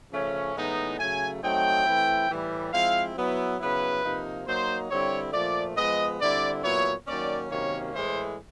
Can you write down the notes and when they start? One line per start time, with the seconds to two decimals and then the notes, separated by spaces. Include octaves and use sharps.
0.11 C#3 F3 A3 C#4
0.55 A2 E3 G#3 B3 D#4
0.99 C#3 F#3 A3 G#5
1.43 F#3 A3 C4 D#4 G5
1.86 E3 A3 C4 E4
2.29 A2 E3 G3
2.72 F3 G#3 C4 E4 F5
3.15 F#3 B3 E4
3.60 C#3 F#3 B3 E4 B4
4.04 C3 F3 A#3 D#4
4.47 F#3 A#3 D#4 C5
4.90 D3 G3 C4 E4 C#5
5.33 A#2 F3 A3 D5
5.76 F3 G#3 B3 D#5
6.20 D3 G3 C4 E4 D5
6.64 A#2 F#3 B3 E4 C#5
7.07 D#3 F#3 A#3 C#4 D5
7.50 C3 D#3 F#3 A#3 C#4 C#5
7.94 A2 E3 G#3 C5